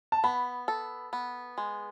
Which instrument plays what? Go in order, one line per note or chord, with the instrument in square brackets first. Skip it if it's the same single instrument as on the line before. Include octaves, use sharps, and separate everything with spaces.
[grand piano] A5
[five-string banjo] B3 [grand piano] B5
[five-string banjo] A4
B3
G#3